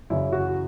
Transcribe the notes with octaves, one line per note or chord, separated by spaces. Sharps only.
F#2 C#3 E3 E4
F#4